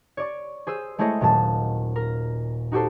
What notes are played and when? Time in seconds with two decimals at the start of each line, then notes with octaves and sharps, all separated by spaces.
0.17 C#5 D5 C#6
0.67 G#4 C5 E6 D#7
0.99 G#3 A3 E4 C5 C#5 D#5
1.21 D#1 A#2 F#3 A5
1.96 A#4
2.72 D#4 F#4 G4 A4 C5